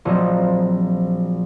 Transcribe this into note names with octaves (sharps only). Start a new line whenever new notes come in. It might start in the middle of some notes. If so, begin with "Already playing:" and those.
A#1 F3 F#3 C4 D#5